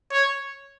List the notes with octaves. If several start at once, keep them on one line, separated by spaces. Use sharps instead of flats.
C#5